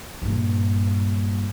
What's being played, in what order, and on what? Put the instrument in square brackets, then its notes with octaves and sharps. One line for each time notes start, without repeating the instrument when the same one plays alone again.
[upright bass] G2 A#2